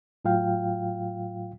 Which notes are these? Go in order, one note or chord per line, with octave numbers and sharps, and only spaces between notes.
A2 F#3 F4 F5 G5